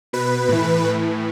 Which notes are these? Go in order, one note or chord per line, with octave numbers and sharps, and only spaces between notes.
B2 B4
A2 E3
A2 E3